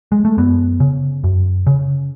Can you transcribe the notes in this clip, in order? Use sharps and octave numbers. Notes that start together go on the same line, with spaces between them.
G#3
A3
F#2 B3
C#3
F#2
C#3